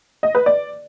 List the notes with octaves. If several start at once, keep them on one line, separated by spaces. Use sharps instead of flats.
D#5
B4
D5